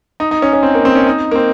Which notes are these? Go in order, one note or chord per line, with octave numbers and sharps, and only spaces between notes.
D#4
D#4
C#4
C#4
C4
A#3
C4
C#4
D#4
A#3
C4